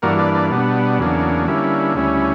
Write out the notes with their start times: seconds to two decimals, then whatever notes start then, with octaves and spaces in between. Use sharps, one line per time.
0.02 G2 E3 A#3 D4 F#4 A#4
0.19 B4 D5
0.35 B4 D5
0.51 B2 G3 B3 D4
0.99 E2 C#3 F#3 A#3 D4
1.47 D3 G3 A#3 C#4 E4
1.95 D2 C#3 G3 C#4 E4